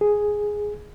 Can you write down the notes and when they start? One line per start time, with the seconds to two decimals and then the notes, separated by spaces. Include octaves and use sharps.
0.01 G#4